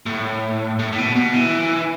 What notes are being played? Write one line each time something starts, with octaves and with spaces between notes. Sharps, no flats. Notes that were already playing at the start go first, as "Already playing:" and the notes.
A2
A2
A2
B2
B2
E3